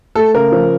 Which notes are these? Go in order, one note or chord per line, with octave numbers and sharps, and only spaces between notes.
A3 A4
C#3 A#4
F3